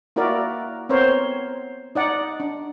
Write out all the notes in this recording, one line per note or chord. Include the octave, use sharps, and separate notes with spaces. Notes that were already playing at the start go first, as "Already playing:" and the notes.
A#3 E4 F#4 A#4 D5 E5
B3 C4 A#4 C5 C#5
D#4 D5 F#5
D4